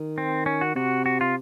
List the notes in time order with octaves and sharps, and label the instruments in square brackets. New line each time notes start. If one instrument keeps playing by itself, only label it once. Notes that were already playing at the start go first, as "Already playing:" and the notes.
Already playing: [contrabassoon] D#3
[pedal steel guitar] C4
C#4
F#4
[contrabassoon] C3 [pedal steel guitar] F#4
[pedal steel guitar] F#4
F4